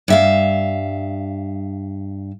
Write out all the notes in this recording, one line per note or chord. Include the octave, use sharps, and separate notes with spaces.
G2 E5 F5